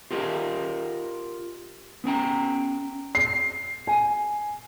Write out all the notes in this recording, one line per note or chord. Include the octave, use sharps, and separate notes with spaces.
F4 G4 A#4 D#5 F5
B3 C#4 G5 A#5
C7
G#5